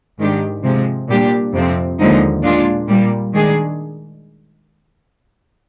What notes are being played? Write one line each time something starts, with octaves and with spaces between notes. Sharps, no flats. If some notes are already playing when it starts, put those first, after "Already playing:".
G#2 D#3 G#3 D4 G4
C3 F3 G#3
A#2 G3 D4 G4
F2 C3 F3 C4
D#2 D3 F3 G#3 D#4
A#2 G#3 D4 F4
A#2 G3 A#3
D#3 G#3 D4 G#4